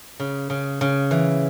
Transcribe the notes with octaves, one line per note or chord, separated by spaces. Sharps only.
C#3
C#3
C#3
E3